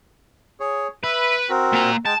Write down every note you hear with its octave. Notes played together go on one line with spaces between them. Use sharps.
G#4 C#5
B4 E5
C4 F#4 A#4
A#2 A#5
G#3 G5 A5